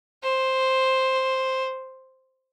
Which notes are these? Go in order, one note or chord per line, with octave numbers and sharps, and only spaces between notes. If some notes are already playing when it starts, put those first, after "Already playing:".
C5